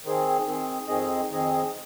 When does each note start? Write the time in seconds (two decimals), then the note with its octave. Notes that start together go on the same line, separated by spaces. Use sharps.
0.04 D#3 C4 G#4
0.45 D#3 C4 G#4
0.87 F2 D#3 C4 G#4 D#5
1.29 F2 D#3 C4 G#4 D#5